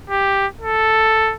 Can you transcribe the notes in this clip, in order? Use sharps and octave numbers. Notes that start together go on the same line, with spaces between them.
G4
A4